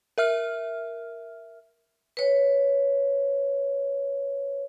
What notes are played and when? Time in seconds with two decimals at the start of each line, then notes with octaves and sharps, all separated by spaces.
0.18 A#4 E5 F6
2.17 B4 C#5